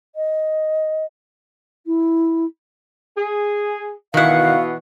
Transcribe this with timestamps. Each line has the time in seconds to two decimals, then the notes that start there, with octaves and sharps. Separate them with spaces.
0.15 D#5
1.86 E4
3.16 G#4
4.14 B2 D#3 E3 E4 F#4 F5 F#5